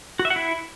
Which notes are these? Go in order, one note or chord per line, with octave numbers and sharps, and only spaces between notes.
F#4
E5
F#5
E4